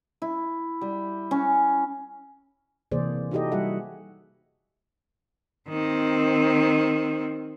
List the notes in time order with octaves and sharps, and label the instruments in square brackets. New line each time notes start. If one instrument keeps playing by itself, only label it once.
[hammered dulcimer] E4
G3
C#4
[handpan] C3 E3 A#3 G#4 C5 D5
D#4 E4 F#4 G4 A4 D#5
G3 F#4 G#4 E5 F#5
[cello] D#3 C4